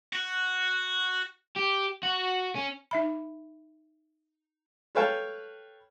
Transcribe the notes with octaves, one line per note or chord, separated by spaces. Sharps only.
F#4
G4
F#4
C#4
D#4 E5 B5
A4 B4 C#5 F5 G5 A5